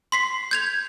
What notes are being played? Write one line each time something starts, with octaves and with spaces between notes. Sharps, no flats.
C6 B6 C7
G6 G#6 F7